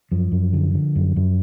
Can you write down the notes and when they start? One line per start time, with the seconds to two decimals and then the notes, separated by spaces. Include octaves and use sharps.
0.12 F#2 F3
0.32 F#2
0.53 D3
0.74 D3
0.96 F#2
1.16 F#2